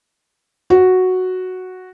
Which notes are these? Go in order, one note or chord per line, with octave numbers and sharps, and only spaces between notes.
F#4